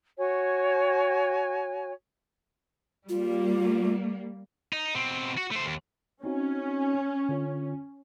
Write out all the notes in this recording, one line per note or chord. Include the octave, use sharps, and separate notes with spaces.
F#4 C#5 G#5
G3 A#3 F4
D#4
B2 C4
F#4
A3 C5
D#2
C4 C#4 D#4 F#4
D3 F4 C#5